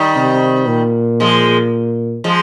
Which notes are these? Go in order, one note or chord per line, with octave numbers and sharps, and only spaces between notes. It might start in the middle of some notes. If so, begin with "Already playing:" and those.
Already playing: D#3 G3
C3
A#2
F3 G#3
F3 G#3